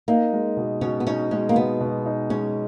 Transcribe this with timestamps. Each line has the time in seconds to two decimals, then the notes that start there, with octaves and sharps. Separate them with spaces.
0.08 A#3 D#4
0.33 G#3
0.57 B2
0.81 B2 C#4
1.00 B3
1.07 C#4 D#4
1.31 G#3 C#4
1.49 A#3
1.56 B2 B3
1.80 B2
2.06 D#4
2.30 G#3 C#4